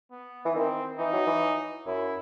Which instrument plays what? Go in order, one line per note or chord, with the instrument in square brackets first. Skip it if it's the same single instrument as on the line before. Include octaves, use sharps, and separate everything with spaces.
[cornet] B3
[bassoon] E3
[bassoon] D#3 [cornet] C4
[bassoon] E3 [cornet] D#4
[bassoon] F#3
E3
[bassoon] F#2 [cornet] E4